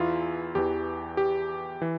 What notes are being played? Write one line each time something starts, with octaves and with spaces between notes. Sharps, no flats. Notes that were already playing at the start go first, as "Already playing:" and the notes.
Already playing: E2 E3 E4 F4
E2 E3 G4
G4
E3